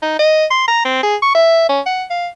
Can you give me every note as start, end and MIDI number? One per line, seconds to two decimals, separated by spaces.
0.02 0.17 63
0.19 0.46 75
0.51 0.67 84
0.68 0.84 82
0.85 1.02 60
1.03 1.16 68
1.22 1.32 85
1.35 1.68 76
1.69 1.80 61
1.86 2.04 78
2.10 2.28 77